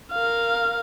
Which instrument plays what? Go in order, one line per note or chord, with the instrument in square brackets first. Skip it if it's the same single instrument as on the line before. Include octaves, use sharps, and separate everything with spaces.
[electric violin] A#4 F5